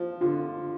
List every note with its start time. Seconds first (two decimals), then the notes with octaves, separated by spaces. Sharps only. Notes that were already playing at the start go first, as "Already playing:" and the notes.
Already playing: F3
0.21 D3 F4